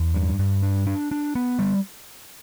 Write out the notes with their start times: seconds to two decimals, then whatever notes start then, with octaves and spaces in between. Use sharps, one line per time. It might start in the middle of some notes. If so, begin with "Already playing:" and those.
Already playing: E2
0.14 G2
0.39 G2
0.63 D4
0.87 D4
1.11 D4
1.35 B3
1.59 G3